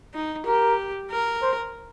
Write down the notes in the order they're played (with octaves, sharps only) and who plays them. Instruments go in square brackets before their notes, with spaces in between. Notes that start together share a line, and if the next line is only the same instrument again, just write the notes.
[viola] D#4
[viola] G4 [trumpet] A#4
[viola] A#4
[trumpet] C5